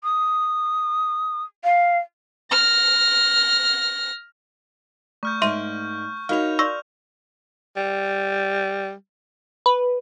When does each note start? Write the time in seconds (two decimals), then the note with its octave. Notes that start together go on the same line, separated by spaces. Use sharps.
0.04 D#6
1.64 F5
2.51 F6 A#6
5.23 A3 C#6 F6 G6
5.42 G#2 A#3 E5 C6 D#7
6.29 D#4 F#4 A#4 C#5 F5 F6 F7
6.59 D5 C6 C#6 E6 A#6
7.76 G3
9.66 B4